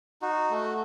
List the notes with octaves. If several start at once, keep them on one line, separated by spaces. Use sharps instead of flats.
D#4 F#4
A3